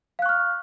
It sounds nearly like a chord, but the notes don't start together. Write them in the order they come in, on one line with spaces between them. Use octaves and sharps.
F5 F#6 C#6 F6